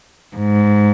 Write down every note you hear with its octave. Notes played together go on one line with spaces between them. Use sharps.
G#2